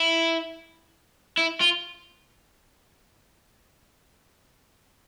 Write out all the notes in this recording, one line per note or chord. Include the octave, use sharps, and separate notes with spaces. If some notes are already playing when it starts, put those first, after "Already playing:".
Already playing: E4
E4
F4